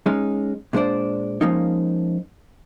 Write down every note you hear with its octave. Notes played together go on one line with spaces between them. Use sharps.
G#3 C#4 D#4
A#2 G#3 D4 C5 D5
F3 G#3 A#3 C#4 D#4